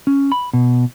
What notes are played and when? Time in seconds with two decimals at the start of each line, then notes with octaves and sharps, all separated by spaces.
0.07 C#4
0.32 B5
0.53 B2